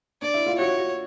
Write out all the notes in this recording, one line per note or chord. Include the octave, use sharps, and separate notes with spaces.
D4 D5
E4
F4
F#4 C#5
F#4